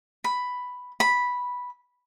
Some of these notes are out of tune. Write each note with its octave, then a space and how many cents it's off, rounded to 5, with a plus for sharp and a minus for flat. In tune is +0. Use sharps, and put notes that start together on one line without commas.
B5 +5
B5 -5